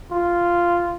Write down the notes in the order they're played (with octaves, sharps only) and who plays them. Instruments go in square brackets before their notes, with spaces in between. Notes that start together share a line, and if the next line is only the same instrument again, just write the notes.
[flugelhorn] F4